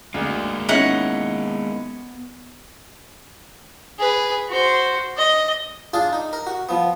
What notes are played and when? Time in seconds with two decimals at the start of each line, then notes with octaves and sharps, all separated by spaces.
0.14 D2 G#3 A#3
0.69 B3 C#4 D#4 E4 F#5
3.99 G#4 B4
4.49 F#4 C5
5.17 D#5
5.93 D4 F4 G#4 D5
6.13 D#4
6.33 A#4
6.47 F#4
6.69 F3 B3